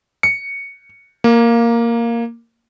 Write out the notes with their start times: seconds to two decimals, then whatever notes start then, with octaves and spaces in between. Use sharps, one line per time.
0.23 C#7
1.24 A#3